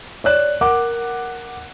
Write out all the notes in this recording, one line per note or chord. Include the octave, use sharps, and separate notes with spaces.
C#5 D5 F#6
A#4 F#5 D6